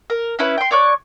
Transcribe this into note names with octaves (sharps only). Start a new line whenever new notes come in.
A#4
C#4 E4 B4
G5 C6
C#5 D5 C#6 F#6